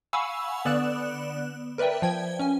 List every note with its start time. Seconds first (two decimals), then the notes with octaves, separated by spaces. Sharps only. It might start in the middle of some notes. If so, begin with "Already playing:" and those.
0.13 F5 F#5 G#5 B5 C#6 E6
0.65 D3 B3 D5 F#6 E7
1.78 A#4 B4 D5 E5 G5
2.02 F3 G5 G#6
2.39 C#4 G#5